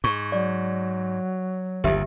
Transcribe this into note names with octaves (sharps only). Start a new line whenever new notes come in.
G#2 C#6
F#3 D5
G1 D#2 G4 E5